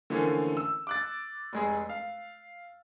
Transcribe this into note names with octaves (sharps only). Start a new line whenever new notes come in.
D3 E3 F3 A3 A#3 C#4
E6
D6 F#6 A6
F1 G#3 G#4
F5